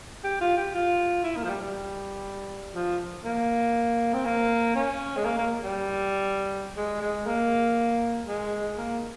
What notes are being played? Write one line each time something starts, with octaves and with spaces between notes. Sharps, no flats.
G4
F4
G4
F4
E4
A#3
F3
G3
G3
F3
A#3
C4
A#3
C#4
G#3
A#3
A#3
G3
G#3
G#3
A#3
G#3
A#3